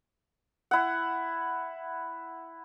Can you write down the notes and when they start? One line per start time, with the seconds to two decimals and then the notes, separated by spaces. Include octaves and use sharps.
0.71 E4 F#5